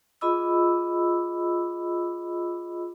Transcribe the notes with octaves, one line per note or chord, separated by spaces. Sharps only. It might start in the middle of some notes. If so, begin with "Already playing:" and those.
F4 G#4 D#5 B5 D6 E6